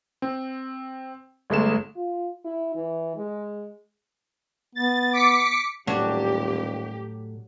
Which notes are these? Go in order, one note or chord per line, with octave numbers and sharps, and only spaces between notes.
C4
G1 G#3 A3 E7
F4
E4
E3
G#3
B3 A6
D6 B6 C#7
D#1 A2 F#3 D4 F#4 G4